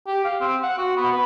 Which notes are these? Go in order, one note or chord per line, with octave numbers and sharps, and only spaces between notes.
G4
F5
C4
F#5
F#4
B3
B4